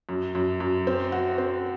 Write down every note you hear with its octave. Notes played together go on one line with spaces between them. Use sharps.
F#2
F#2
F#2
C4
F#4
C4